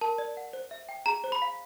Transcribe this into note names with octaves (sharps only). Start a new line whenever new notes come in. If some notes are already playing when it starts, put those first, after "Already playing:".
A#4 A5
D5
F#5
C5
E5
G5
G#4 A#5
C5
B5
F5